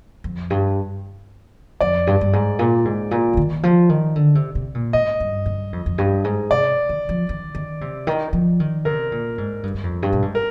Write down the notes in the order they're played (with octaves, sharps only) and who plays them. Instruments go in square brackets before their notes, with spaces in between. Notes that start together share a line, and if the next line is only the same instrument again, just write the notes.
[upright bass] F2
G2
[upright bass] F2 [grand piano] D5
[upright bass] G2
G2
G#2
A#2
G#2
A#2
F3
D#3
F3
D#3
D3
C3
C3
A#2
[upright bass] G#2 [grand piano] D#5
[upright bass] G2
G2
F2
F2
G2
G#2
[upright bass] C3 [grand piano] D5
[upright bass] D#3
F3
D#3
D#3
C3
D#3
F3
D#3
[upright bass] C3 [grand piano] A#4
[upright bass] A#2
G#2
G2
G2
F2
G2
A#2
G#2
[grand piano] A#4